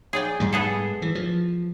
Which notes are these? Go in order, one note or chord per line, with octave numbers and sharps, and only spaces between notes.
G#4 D5 G5
G#2 G3
B3 G#4 A4
E3
F3